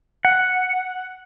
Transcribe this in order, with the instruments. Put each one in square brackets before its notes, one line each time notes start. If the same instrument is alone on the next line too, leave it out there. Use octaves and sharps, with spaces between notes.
[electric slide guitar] F#5